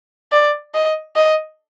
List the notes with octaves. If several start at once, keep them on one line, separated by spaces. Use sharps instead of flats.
D5
D#5
D#5